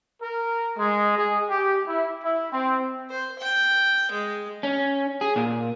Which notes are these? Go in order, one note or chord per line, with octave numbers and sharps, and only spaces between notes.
A#4
G#3
G#4
G4
E4
E4
C4
C5
G5
G#3
C#4
G#4
A#2